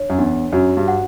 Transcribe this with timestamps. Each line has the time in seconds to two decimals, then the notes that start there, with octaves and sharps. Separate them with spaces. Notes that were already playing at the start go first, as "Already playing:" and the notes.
Already playing: D4 C#5
0.10 F#2
0.18 E2 D4
0.53 F#2 F#4
0.77 G2
0.88 F#5